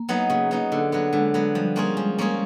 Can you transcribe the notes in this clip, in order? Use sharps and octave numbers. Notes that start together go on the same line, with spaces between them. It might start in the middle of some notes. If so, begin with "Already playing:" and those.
Already playing: A#3
F#3 B3 D#4
C#3
F#3 B3 D#4
D3
F#3 B3
D3 G#3
F#3 B3
F3 G3
A#3 C#4 F4 G#4
F3 G#3
A#3 C#4 F4 G#4